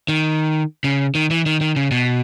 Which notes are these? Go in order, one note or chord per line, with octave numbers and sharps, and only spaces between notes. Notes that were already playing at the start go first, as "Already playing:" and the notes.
D#3
C#3
D#3
E3
D#3
D#3
C#3
B2